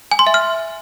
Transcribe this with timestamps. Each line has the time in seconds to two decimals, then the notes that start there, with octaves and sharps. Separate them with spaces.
0.11 G#5
0.19 C6
0.27 E5
0.34 F6